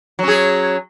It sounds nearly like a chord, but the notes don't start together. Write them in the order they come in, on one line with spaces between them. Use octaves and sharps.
F#3 C#4 G#4